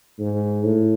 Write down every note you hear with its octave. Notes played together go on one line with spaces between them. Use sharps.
G#2
A2